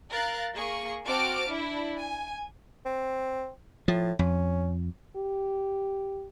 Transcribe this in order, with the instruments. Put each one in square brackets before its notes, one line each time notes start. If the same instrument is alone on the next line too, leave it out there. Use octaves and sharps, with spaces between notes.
[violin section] A#4 F5 A#5 F#6 A6
A#3 G#4 C#6
C4 F#4 A5 D6 F6 D7
D4 E4
G#5
[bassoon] C4
[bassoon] A2 [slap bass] F3
[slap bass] F2 [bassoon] C#4
[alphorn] G4